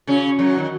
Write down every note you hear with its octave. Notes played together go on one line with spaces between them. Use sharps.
C#3 C#4 F#4
F#2 F#3
D#3